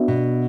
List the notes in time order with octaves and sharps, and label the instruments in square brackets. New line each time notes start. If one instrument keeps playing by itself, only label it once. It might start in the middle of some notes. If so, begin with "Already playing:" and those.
Already playing: [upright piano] B3 D4 F#4 E5
[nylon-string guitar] B2